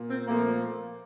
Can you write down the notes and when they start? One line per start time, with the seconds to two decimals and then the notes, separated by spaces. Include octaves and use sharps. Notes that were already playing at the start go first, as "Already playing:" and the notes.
Already playing: A#2
0.09 C4
0.27 A#2 F3 A3 A#3